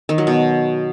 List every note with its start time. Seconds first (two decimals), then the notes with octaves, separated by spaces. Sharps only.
0.09 D#3
0.18 F#3
0.27 B2